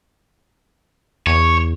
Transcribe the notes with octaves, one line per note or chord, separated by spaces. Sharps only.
E2 C#5